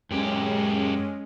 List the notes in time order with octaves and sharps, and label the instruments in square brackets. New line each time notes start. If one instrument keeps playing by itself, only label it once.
[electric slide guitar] F#2 G4 [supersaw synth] G#3 C#4